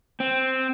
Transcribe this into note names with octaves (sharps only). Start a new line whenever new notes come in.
C4